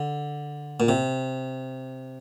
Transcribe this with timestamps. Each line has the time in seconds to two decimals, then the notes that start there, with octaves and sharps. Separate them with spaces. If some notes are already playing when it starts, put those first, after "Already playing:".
Already playing: D3
0.80 A#2
0.89 C3